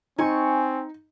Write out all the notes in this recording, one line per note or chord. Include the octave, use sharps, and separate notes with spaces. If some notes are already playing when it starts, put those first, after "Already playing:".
C4 D#4 G#5 C#6